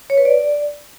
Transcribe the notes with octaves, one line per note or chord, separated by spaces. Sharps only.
C#5
B4
D5